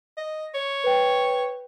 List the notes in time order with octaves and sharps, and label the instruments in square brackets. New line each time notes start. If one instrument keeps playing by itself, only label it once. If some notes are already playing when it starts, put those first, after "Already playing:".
[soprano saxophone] D#5
C#5
[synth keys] B4 G5